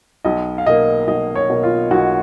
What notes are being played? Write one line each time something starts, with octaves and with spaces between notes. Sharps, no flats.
B1 D#5
F5
B2 A#3 D#5
B1 D#5
C#5
B2 A#3
F4
B1 F#4